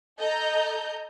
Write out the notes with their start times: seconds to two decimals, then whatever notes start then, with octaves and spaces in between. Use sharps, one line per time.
0.20 A4 D#5 A#5 G6